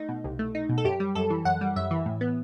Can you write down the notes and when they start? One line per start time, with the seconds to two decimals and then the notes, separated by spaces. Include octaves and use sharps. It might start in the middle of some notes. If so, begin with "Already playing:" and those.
Already playing: A3 D#4
0.09 B2
0.24 C2
0.39 A3
0.55 D#4
0.69 B2
0.78 A4
0.85 F#2 G4
1.00 G3
1.15 F#2 A4
1.30 E3
1.45 F#2 F#5
1.61 G3
1.76 F#2 E5
1.91 E3
2.06 A2
2.21 B3